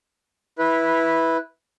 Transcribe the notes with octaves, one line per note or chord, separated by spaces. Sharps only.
E4 B4